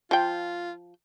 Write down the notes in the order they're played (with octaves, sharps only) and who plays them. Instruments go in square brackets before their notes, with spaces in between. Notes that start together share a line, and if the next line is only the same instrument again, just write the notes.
[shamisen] F3 G5 [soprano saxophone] F4